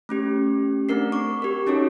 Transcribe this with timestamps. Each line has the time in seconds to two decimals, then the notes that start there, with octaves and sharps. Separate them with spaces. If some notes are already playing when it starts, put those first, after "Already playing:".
0.09 A3 C#4 G4
0.89 A3 C4 D4 A#4 C7
1.12 C#6 D6
1.42 G4 A#4
1.67 C#4 D#4 F#4 A4 C#5